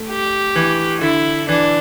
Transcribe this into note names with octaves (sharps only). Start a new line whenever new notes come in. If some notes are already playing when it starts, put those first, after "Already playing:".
Already playing: A3
G4
E3
D3 E4
E3 D4